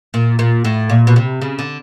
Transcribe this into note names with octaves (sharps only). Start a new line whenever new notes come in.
A#2
A#2
A2
A#2
B2
C3
C#3
D3